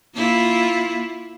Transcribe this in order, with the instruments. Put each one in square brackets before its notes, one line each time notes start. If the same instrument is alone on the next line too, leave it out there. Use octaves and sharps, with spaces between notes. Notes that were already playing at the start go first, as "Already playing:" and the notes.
[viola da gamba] A#3 E4 F4